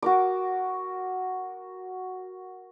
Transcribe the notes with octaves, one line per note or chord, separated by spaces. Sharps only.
F#4 A#4 D6